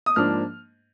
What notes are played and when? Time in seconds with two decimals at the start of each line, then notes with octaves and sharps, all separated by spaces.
0.06 D#6
0.16 G#2 F3 A#3 D4 F6